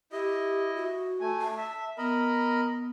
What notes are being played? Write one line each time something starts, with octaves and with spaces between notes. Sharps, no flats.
E4 G4 D#5
F#4
A3 G#5
A5
E5
B3 A#4 D#5 B5